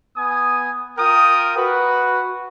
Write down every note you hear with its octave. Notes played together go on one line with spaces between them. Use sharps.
B3 G#5 D#6
F4 A#4 G5 D#6
F#4 B4